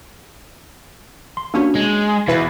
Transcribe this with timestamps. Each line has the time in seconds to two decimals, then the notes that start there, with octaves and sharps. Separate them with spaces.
1.37 C6
1.54 A#3 C#4 D4 F#4
1.75 G#3
2.28 E2 B2 E4 B4